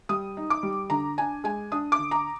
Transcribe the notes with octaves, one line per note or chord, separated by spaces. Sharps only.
G3 D#6
D#4
D6
G3
D3 A#5
D4 G#5
G#3 G#5
D4 D#6
D6
D3
A#5